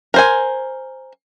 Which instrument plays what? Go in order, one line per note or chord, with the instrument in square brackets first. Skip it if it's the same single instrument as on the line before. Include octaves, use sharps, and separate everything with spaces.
[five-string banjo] A#4 C5 G#5